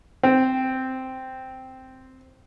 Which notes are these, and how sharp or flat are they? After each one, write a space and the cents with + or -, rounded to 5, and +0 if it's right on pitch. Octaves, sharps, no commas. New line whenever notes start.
C4 -5